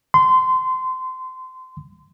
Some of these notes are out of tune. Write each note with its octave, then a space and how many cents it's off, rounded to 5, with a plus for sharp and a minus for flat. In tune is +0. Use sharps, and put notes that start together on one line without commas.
C6 -25